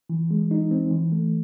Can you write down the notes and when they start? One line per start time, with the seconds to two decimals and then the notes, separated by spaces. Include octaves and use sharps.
0.09 E3
0.31 G#3
0.51 D#4
0.71 C4
0.91 E3
1.12 A3